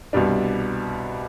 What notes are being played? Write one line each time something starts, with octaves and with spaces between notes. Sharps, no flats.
C2 B2 G3 D4